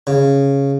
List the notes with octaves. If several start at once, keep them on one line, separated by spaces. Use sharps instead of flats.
C#3